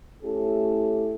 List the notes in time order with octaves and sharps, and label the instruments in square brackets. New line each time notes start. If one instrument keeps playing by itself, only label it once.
[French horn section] A3 C#4 E4 G4 A4